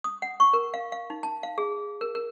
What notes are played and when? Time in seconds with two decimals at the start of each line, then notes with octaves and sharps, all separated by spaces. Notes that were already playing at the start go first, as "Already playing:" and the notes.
0.04 D#6
0.22 F#5
0.40 C#6
0.53 A#4
0.74 F5
0.92 F5
1.10 D#4
1.23 A5
1.43 F5
1.58 G#4
2.01 A#4
2.15 A#4